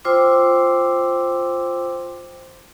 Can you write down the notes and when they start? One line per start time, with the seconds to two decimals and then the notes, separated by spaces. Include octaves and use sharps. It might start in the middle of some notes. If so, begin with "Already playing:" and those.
0.05 F4 C5 G5 C6 D6 E6